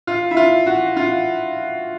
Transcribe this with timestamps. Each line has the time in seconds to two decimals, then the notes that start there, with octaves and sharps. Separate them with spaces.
0.07 F4
0.31 E4
0.37 F4
0.66 F#4
0.97 F4